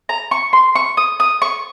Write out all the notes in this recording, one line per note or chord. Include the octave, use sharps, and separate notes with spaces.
A#5
C#6
C6
C#6
D#6
D#6
C#6